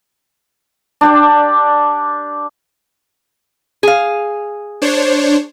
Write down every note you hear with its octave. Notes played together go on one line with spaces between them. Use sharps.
D4 G4 D5
G#4 F5
D4 C5 C#5